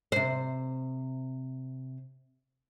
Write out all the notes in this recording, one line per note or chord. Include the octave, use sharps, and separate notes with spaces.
C3 C5